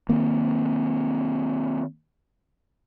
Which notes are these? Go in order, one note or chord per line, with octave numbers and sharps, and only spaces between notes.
D#3 A#3 C4